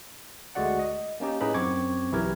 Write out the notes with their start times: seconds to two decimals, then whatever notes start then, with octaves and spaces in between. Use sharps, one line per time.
0.55 D2 G#3 A3 F#4 D5 F#5
0.79 D#5
1.20 A#3 C#4 D#4 G4
1.41 A2 C#4 D#4 G#4 B4 B5
1.54 F#2 C4 C#6 D6 G#6
2.12 B1 E3 E4 G4 A#4 G#6